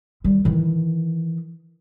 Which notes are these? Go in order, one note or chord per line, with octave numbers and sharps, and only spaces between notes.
D#3 G3
D#3 E3